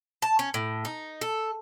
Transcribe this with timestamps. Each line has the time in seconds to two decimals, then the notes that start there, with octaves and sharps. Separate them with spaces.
0.22 A5
0.39 C#4
0.54 A2
0.85 D#4
1.21 A4